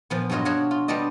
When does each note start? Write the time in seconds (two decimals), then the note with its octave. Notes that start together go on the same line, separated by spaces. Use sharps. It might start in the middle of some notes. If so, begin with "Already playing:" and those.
0.10 A#2 F3 B3
0.30 G2 B2 F#3 F4 D#5
0.45 D4 F#4 C#5 D#5 F5 F#5
0.71 F4
0.88 G3 B3 D4 F4 D5 D#5